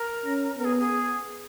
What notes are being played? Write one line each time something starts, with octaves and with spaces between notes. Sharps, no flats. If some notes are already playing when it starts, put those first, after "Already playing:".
Already playing: A#4
C#4
B3 A#4
G#4
G#4